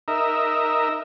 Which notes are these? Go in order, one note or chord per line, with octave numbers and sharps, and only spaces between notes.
D#4 A#4 E5